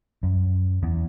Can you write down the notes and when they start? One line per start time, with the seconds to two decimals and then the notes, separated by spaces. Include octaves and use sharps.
0.23 F#2
0.83 E2